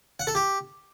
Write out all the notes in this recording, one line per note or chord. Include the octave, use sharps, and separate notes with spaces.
F#5
A4
G4